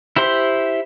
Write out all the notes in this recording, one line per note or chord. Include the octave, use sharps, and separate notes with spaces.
E4 G4 C5 C6